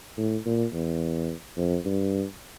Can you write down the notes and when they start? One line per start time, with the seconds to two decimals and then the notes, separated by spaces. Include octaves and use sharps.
0.17 A2
0.45 A#2
0.73 E2
1.57 F2
1.85 G2